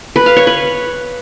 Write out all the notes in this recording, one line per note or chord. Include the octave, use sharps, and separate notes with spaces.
B4
F5
C#5
B4